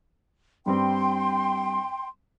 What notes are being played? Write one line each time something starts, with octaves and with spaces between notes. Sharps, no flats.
G2 G3 C4 G5 C6